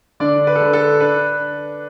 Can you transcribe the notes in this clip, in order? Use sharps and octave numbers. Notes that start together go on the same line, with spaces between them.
D3 D4 D5
B4
A4
D3 B4
A4
D4 B4